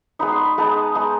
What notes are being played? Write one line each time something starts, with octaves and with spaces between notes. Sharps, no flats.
G#3 B3 D#4 B5
C6
B5
G#3 B3 D#4 A5
G#3 B3 D#4